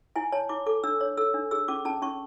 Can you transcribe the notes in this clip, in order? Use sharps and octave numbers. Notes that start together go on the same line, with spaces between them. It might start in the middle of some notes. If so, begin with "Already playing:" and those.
E4 G#5
C#5 A5
E4 D6
A4 D6
D4 E6
C#5
A4 E6
D4
G#4 E6
C#4 D6
C#4 A5
C#4 C#6